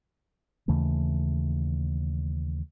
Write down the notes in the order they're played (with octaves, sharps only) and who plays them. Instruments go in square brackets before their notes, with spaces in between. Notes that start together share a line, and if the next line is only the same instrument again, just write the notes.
[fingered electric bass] D#2 C#3 E3 A3